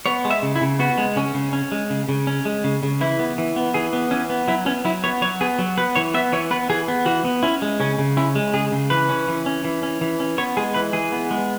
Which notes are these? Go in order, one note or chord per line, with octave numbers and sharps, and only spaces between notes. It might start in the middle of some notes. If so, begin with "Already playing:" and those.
B3 C#5
G#3
E5
C#3
E4
C#3
B3 F#4
G#3
C#3 C#4
C#3
C#4
G#3
C#3
C#3
C#4
G#3
C#3
C#3
E3 E4
B3
E3
B3
E3 G#4
B3
E3 C#4
B3
F#3 E4
B3 C#4
F#3 E4
B3 C#5
F#3 C#5
B3 G#4
F#3
B3 B4
E3 C#5
B3 E5
E3 C#5
B3 B4
E3 G#4
B3
E3 F#4
B3
C#4 E4
G#3
C#3 C#4
C#3
C#4 E4
G#3
C#3 G#4
C#3
E3 B4
C#4
E3
C#4
E3
C#4
E3
C#4
B3 C#5
G#3 G#4
E3 B4
E3 G#4
B3
G#3